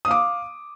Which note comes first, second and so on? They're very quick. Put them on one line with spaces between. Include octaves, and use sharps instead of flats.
D#6 F5 D6